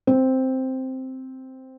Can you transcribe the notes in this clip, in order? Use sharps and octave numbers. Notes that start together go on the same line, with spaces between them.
C4